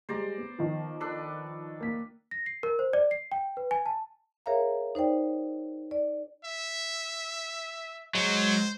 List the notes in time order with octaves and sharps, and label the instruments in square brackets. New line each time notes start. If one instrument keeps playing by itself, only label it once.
[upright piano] G3 G#3 [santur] C5 D5 A#5
[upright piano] B3
[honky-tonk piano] D#3 F3
[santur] D4 A4 B4
[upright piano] A#3 B6
[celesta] A#6
C7
A#4
C5
D5
C7
G5
B4
G#5
A5
[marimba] G#4 A#4 C#5 E5 F5 A#5
D#4 C5 D5 G5
D5
[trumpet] E5
[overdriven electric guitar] F#3 [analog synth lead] G#3 [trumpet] C5